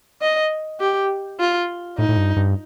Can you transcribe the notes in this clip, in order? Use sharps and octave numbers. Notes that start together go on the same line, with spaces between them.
D#5
G4
F4
A2 D#4
A2
G2
G2